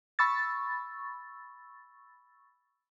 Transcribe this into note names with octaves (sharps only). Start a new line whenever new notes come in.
B5 C#6 E6 A6